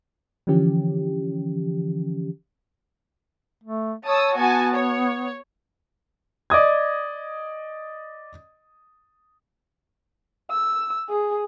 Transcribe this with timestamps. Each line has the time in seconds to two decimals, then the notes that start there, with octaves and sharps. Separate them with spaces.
0.47 D3 E3 F3 C#4 G4
3.63 A3
4.06 C#5 A5 D#6 E6
4.38 B3 F#4 G#5 A5
4.74 C#5
6.50 D5 D#5 D#6 G#6
10.50 E6
11.09 G#4